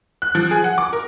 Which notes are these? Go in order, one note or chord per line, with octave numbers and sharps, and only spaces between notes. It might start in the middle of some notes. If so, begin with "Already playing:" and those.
F#6
F3
G#4
F#5
D6
A#4